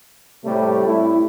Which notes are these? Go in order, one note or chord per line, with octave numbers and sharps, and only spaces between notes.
A2 C3 G3 A3
E4